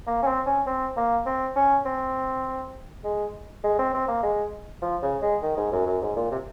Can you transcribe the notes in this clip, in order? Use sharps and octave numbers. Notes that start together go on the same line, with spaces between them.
A#3
C#4
C4
C#4
C4
A#3
C4
C#4
C4
G#3
G#3
C4
C4
A#3
G#3
F3
C#3
G#3
D#3
G#2
F#2
F#2
G#2
A#2
C3